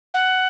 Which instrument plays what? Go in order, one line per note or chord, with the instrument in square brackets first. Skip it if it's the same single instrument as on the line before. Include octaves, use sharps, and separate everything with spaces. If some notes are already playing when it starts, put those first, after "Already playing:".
[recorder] F#5